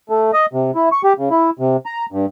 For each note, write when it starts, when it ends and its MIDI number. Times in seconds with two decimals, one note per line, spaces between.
0.09 0.31 57
0.33 0.46 75
0.53 0.71 48
0.75 0.89 64
0.92 1.02 85
1.04 1.13 67
1.18 1.29 49
1.30 1.50 64
1.59 1.77 48
1.86 2.06 82
2.12 2.26 43